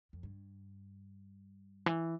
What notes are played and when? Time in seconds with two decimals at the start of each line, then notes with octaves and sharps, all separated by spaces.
0.13 F2
0.23 G2
1.86 E3